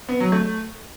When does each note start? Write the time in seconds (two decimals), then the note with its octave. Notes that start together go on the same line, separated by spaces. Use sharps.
0.09 B3
0.20 F#3
0.32 A3